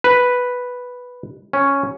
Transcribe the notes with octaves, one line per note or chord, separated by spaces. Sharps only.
B4
C#4